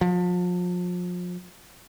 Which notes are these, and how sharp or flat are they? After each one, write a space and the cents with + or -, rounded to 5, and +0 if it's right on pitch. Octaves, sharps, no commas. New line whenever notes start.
F3 +35